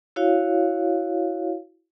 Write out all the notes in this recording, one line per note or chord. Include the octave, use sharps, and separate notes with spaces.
E4 F#4 C#5 F5